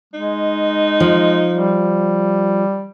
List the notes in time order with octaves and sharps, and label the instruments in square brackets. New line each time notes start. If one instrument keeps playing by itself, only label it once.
[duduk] G#3 [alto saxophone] D#4
[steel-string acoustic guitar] F3
[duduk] G3